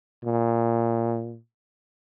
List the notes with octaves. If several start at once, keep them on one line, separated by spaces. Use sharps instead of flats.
A#2